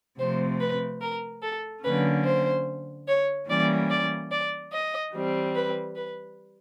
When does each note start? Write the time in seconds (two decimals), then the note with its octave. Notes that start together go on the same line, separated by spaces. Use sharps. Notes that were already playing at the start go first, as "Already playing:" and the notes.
0.19 C3 F3 A3 C4 C5
0.60 B4
1.01 A#4
1.42 A4
1.84 D3 F#3 A#3 C#4 B4
2.25 C5
3.07 C#5
3.48 E3 G3 A#3 C#4 D5
3.90 D5
4.31 D5
4.72 D#5
5.13 E3 G3 C4
5.55 B4
5.96 B4